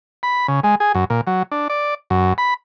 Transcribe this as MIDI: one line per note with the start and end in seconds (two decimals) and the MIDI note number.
0.23 0.47 83
0.48 0.60 49
0.64 0.75 56
0.80 0.92 68
0.95 1.05 42
1.10 1.21 46
1.27 1.43 54
1.52 1.68 62
1.70 1.94 74
2.10 2.33 42
2.38 2.54 83